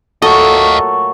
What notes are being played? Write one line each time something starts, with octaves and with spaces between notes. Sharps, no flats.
A#2 F#3 A3 A4 D#5 F5 C#6